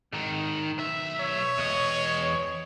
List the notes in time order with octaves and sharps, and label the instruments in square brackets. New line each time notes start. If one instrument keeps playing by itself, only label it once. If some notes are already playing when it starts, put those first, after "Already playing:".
[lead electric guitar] G#2 D#3
B1 E5
[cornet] C#5
[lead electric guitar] E2 D#5